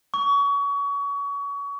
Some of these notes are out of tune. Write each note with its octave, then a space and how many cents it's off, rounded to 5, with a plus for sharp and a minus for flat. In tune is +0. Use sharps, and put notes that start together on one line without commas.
C#6 +30